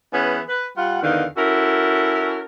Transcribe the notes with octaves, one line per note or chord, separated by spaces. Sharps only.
E3 B3 C#4 G#4 B4
B4
G3 F4 F#5
E2 D3 D#3 D#4 F5
C#4 E4 F#4 A4 A#4